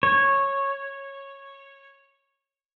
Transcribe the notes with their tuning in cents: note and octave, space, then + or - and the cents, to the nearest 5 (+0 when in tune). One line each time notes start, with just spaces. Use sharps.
C#5 -10